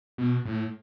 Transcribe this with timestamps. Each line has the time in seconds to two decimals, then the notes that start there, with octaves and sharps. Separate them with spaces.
0.18 B2
0.45 A2